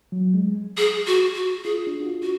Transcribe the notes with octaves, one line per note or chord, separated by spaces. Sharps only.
F#3
G#3
G#4
F#4
F#4
F4 G#4
D4
F#4
F4
F#4